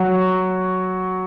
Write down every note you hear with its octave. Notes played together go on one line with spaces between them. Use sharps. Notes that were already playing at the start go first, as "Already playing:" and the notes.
Already playing: F#3 F#4